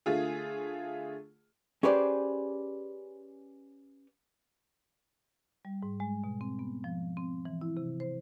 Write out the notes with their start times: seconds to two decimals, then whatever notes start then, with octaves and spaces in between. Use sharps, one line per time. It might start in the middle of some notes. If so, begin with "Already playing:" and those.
0.06 D3 A3 F4 G#4
1.83 C#4 G4 G#4 B4 C5 D5
5.65 G3
5.83 G#2
6.00 G#3
6.24 B2
6.41 C4
6.59 B3
6.84 F3
7.17 C4
7.45 E3
7.61 E4
7.77 C3
8.00 C5